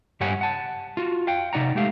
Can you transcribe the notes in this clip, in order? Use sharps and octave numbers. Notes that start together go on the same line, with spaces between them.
G2 G3 G4 C#5 F#5 G#5
F#5 A5
F4 F#4
F5 G5
C3 D#4 D5 F#5 A#5
G#3 A3 G4 F5